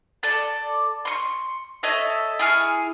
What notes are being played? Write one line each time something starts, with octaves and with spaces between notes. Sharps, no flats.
A4 D5 A5
C6 C#6
A4 C#5 D#5 E5
E4 G#4 C#6 F6